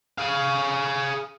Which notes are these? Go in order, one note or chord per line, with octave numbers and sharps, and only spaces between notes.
G#4 F5